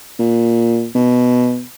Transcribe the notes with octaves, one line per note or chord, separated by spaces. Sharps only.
A#2
B2